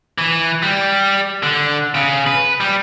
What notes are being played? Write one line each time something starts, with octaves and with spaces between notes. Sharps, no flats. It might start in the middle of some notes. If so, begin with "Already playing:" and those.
E3
G3
D3
C#3
B4
G3